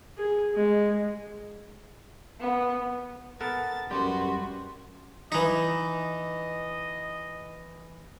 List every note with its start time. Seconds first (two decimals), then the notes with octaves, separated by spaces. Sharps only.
0.18 G#4
0.54 G#3
2.40 B3
3.41 B3 A4 A#4 A6
3.91 F#2 G3 F#4 G4 B4 C6
5.32 E3 D#4 D#5